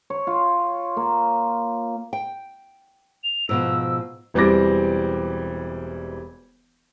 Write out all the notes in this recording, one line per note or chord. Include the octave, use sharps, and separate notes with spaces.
C#5
F4
A#3
G5
F7
G#2 B2 F3 E6
E1 E3 G3 C4 D6 A#6